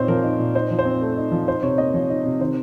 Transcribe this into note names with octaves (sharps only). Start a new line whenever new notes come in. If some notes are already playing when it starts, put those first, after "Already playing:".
Already playing: A#2 C4 D#4 C5 C#5
F3 A#4
D#4
A#2
D#4 C5
F3
C5
C4
A3
D#4
F3
D#4 C5
C3 C#5
A#3 D#5
F3 C#5
D#4
C3
D#3 C5